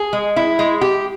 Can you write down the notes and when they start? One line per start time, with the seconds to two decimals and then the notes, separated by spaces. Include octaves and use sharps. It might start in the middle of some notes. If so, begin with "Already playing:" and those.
Already playing: G#4
0.13 G#3
0.36 E4
0.59 G#3
0.81 G4